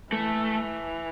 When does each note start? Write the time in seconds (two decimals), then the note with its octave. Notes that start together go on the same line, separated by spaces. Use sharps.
0.12 E3 A3